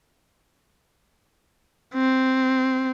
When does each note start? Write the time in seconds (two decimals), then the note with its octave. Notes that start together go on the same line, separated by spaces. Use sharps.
1.94 C4